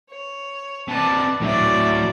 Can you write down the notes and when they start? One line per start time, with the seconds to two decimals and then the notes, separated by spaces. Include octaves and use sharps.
0.10 C#5
0.88 C3 B4 D5 A5
1.41 A2 F#3 D5 E5